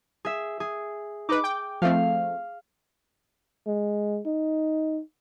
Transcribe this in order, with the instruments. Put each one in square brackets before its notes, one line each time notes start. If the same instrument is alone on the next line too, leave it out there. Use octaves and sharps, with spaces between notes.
[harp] G#4 E5
G#4
[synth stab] D#4 B4 [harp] D6
[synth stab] G5
[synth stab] F3 A3 C4 [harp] F5
[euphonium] G#3
D#4